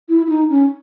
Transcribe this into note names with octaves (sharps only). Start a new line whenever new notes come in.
E4
E4
D#4
C#4